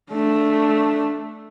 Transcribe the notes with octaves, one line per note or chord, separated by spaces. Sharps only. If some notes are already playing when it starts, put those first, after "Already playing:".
A3 D4